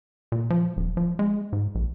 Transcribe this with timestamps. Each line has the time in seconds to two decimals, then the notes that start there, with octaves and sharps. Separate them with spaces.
0.32 A#2
0.50 F3
0.77 D#1
0.97 F3
1.19 G#3
1.53 G#2
1.75 A#1